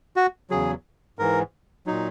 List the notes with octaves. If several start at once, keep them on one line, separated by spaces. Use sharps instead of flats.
F#4
E2 C#3 F#3 G#4
G#2 E3 A#4
A#2 F#3 D#4